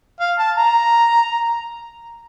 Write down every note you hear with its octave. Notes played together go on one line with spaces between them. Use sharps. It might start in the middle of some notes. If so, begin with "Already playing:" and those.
F5
A5
A#5